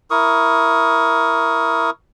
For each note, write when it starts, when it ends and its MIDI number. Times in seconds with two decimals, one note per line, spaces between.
0.11 1.90 64
0.11 1.90 70
0.11 1.90 85
0.11 1.90 87